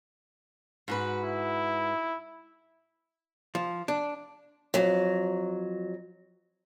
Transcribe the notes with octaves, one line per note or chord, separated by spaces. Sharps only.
G#2 F#4 B4
E4
F3
D4
F2 F#3